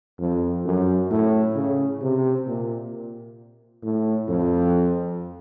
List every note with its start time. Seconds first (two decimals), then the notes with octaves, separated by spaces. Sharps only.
0.19 F2
0.65 F#2
1.11 A2
1.55 C#3
2.01 C3
2.47 A#2
3.83 A2
4.28 F2